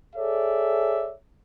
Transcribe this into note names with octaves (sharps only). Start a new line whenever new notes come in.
G#4 A4 C#5 D5 E5